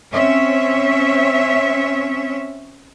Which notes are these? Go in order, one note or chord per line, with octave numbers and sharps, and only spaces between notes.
C4 C#4 C#5 E5